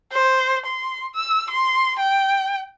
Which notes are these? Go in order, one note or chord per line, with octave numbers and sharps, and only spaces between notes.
C5
C6
E6
C6
G5